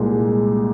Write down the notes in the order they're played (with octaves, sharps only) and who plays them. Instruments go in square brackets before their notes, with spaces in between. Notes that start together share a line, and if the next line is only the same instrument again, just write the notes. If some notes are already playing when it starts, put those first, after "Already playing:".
Already playing: [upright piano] C2 A#2 G#3